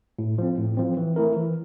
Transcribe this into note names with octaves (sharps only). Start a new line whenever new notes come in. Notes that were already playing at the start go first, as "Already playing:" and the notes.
A2
F3 C4
A2
F3 C4
E3
A3 E4 A#4
E3